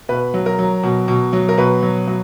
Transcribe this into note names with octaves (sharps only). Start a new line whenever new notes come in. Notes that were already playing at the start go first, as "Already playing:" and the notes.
B2 B4
F#3
A#4
F#3
B2
B2
F#3
A#4
B2 B4
F#3
F#3